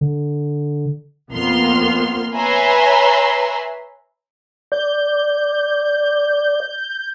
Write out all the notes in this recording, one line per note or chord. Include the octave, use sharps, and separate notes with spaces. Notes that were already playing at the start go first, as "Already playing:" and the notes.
D3
F2 A#3 B3 C6 F6
B4 C#5 E5 G#5 A#5 C6
D5 G6